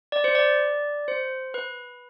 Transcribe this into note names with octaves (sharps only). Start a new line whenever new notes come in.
D5
C5
D5
C5
B4